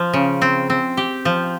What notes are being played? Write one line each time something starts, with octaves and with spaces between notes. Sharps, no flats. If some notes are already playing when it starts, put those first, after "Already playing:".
Already playing: F3
C#3
C4
C4
G4
F3